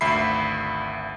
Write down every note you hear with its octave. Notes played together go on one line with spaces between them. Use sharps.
G#1 D2 E5 B5 C7